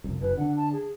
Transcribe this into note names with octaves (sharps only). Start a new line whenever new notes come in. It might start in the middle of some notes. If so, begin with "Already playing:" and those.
F1 C2
F#1 B4
D3 D4 F#5
A5
G#4